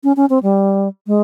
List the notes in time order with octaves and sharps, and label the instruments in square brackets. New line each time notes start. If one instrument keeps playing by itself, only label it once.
[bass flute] C#4
C#4
C4
G3
G#3